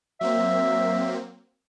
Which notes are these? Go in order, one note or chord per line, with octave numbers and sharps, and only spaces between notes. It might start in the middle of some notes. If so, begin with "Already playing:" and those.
F#3 A#3 C4 E5